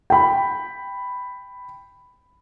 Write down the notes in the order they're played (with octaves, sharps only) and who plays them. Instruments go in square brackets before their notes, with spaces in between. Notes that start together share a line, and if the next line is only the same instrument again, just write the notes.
[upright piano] G5 B5